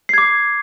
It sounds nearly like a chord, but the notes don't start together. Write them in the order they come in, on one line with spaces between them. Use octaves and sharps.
C7 G#6 D6